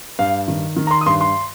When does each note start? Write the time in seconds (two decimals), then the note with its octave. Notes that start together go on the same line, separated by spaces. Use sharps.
0.19 G2 F5
0.48 D#3
0.77 D#3
0.87 A#5
0.91 C6
1.01 D#6
1.06 G2 C6
1.21 C6